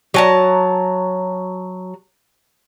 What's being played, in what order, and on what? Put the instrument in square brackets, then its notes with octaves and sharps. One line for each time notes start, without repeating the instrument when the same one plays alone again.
[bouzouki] F#3 A5 A#5